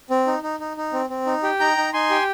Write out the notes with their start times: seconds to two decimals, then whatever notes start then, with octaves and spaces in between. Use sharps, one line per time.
0.10 C4
0.27 D#4
0.43 D#4
0.60 D#4
0.77 D#4
0.93 C4
1.10 C4
1.26 D#4
1.43 G4
1.59 D#4 G5 A#5
1.77 D#4
1.93 D#4 G#5 C6
2.10 G4